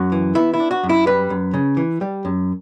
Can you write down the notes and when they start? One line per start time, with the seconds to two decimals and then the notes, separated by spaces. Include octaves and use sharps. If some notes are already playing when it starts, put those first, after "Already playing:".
Already playing: F#2 F#4
0.12 E3
0.35 B3 E4
0.54 E4
0.60 D4
0.71 F#4
0.84 F#2
0.89 E4
1.06 G3 B4
1.30 F#2
1.54 C#3
1.77 E3
2.01 G3
2.25 F#2